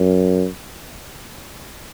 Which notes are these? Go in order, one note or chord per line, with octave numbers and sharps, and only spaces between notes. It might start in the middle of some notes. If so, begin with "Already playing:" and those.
Already playing: F#2